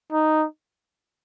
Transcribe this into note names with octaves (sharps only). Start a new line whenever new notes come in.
D#4